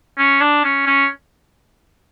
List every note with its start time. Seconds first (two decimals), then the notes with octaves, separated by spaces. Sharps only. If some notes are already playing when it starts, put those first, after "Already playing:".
0.18 C#4
0.41 D4
0.64 C#4
0.87 C#4